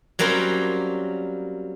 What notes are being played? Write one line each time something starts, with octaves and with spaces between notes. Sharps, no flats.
F#3 G3 A#3 C4 C#4 F#4